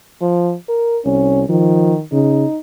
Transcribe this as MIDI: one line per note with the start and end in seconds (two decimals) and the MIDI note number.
0.21 0.54 53
0.68 0.99 70
1.05 1.47 36
1.05 1.43 61
1.49 2.02 51
1.49 1.94 53
2.12 2.45 49
2.12 2.59 63